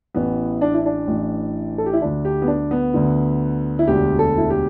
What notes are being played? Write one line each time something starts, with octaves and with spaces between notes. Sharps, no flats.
A1 A2 E3 B3
D4
E4
D4
A1 A2 E3
A4
G4
E4
D2 D3 D4
G4
B3
D4
B3
D2 D3
E4
E1 D2 D3 G4
A4
E4
G4